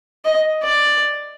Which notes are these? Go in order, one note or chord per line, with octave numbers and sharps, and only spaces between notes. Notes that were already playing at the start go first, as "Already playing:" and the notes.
D#5
D5